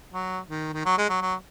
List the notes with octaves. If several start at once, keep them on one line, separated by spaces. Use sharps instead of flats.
F#3
D#3
D#3
F#3
G#3
F#3
F#3